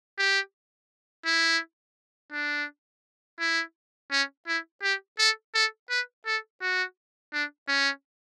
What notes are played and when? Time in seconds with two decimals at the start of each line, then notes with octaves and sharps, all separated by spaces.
0.18 G4
1.25 E4
2.32 D4
3.40 E4
4.11 C#4
4.47 E4
4.83 G4
5.19 A4
5.54 A4
5.90 B4
6.26 A4
6.61 F#4
7.33 D4
7.68 C#4